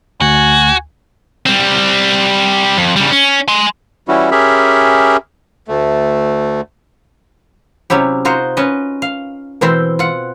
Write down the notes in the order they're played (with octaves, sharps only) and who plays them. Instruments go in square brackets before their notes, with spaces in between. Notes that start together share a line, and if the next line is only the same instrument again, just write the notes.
[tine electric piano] D2 [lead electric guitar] F#4 [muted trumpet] G#5
[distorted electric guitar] G3 C4
F2
C#3 G3
C#4
G#5 C6
[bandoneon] E3 G3 C#4 E4 F#4
C#4 G4 G#4 A#4 E5 B5
D2 A3
[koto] C3 F#3 C#4 E4 G4
D#4 F4 F#4 C5
C#4 B4 D#5
F5
B2 E3 C4 E4 C5
F4 F#5